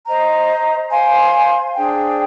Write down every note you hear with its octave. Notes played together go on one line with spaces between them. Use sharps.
C5 D#5 A#5
C5 F5 G#5 C6
D4 G#4 C5 G5